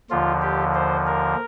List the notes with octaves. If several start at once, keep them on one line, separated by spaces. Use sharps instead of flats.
D#2 D3 F3 F4
G4
C5
A#4